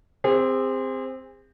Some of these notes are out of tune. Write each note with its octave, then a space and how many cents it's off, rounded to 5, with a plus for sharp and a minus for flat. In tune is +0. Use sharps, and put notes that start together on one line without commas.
C4 -5 G#4 -40